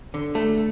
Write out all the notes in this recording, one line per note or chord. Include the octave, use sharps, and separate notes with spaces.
D3
A3